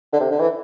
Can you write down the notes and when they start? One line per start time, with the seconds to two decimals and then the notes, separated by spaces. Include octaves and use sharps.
0.13 D3
0.20 C3
0.31 D3
0.40 E3